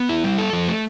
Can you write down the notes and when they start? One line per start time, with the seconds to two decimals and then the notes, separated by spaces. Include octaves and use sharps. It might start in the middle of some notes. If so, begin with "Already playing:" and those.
Already playing: B3
0.09 E4
0.24 G3
0.38 A4
0.53 F3
0.68 A3